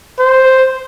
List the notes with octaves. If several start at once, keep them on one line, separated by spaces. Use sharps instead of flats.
C5